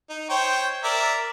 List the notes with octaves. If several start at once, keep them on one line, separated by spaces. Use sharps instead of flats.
D#4
C5 C#5 G5
A#4 D5 E5